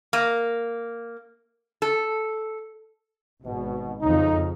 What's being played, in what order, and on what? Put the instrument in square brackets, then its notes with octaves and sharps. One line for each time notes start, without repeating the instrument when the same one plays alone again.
[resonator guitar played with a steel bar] A#3
A4
[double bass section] G#1 [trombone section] B2
[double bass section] F2 C#3 [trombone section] D#4